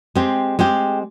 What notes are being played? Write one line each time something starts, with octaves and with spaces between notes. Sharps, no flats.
G#3 C4 G4
G#3 C4 G4